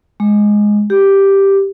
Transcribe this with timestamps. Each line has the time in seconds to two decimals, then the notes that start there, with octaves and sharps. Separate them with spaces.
0.20 G#3
0.90 G4